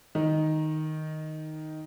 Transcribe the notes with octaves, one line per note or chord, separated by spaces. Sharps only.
D#3 D#4